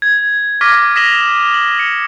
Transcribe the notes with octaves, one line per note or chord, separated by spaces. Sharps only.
G#6
C#6 D6 F6 G#6 A#6 B6
D#6 A#6 B6 E7 F#7 G7
F#7
C#7